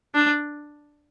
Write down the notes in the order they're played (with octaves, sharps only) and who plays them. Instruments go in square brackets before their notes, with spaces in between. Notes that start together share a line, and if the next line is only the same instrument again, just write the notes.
[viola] D4